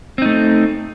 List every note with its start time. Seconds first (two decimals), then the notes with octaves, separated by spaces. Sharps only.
0.18 C4
0.22 D#4
0.26 A3